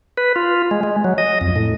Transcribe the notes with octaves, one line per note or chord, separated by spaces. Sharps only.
B4
F4
G#3
G#3
F#3
D#5
F2
A2